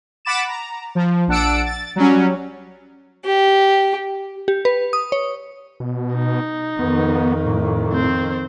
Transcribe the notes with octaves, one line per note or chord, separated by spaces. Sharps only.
F#5 B5 D6 A6 D7 E7
A#5
F3
A#1 D4 F#5 A5 E6 D7
A6
F#3 G3 C#4
G4
G4
B4
D#6
C#5
B2
D#4
F2 D#3 B3
A2
C4 C5